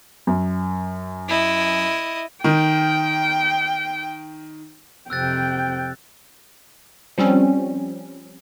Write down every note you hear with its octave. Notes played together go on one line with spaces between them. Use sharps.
F#2
E4 D#5
D#3 G5
F2 C3 G5 E6 F#6 A6
F3 G3 C4 C#4